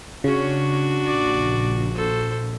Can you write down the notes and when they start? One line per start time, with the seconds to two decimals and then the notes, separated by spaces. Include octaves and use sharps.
0.24 C#3 C#4 D4 F#4
1.06 A#1 D5
1.95 A4 C5